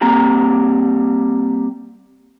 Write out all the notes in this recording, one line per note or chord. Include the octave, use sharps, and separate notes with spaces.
G3 A#3 C4 A#5